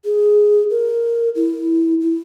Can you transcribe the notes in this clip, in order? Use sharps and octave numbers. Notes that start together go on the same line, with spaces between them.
G#4
A#4
E4
E4